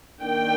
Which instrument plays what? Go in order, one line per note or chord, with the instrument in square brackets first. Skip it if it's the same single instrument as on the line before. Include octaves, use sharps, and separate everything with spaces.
[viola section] D#3 A#3 D4 G5